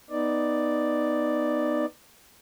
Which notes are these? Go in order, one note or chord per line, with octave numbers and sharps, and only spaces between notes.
B3 D#4 D5